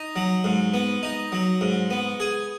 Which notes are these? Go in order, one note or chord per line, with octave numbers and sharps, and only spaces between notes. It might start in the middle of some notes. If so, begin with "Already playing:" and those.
Already playing: D#4
F#3
G#2
B3
D#4
F#3
G#2
B3
G#4